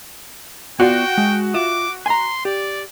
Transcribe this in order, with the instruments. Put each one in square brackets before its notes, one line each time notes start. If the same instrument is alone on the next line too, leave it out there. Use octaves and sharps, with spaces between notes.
[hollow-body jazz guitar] B3 F4 D5 [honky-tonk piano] F#4 [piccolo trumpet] G5
[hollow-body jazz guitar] G#3
[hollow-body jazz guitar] F4 E5 [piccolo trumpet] D6
[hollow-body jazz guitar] G#5 A#5 [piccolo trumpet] C6
[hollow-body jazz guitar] G4 [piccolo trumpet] D5